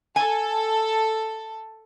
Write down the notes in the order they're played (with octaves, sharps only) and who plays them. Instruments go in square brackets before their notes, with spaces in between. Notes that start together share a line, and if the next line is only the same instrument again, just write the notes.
[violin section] A4 [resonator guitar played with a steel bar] G#5